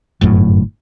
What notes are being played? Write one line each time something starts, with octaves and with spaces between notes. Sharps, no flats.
G1 F#2 A2